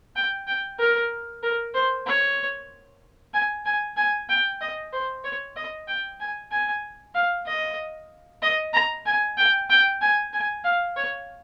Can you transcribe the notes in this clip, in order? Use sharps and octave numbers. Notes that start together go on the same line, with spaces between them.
G5
G5
A#4
A#4
C5
C#5
G#5
G#5
G#5
G5
D#5
C5
C#5
D#5
G5
G#5
G#5
F5
D#5
D#5
A#5
G#5
G5
G5
G#5
G#5
F5
C#5